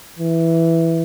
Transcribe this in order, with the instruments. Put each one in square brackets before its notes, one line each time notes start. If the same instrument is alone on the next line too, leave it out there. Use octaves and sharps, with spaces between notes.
[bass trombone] E3